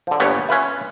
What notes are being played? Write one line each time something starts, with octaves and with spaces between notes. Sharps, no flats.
D3 F3
G1 A#2 G3 B3 C#5
C#4 F4 B4 E5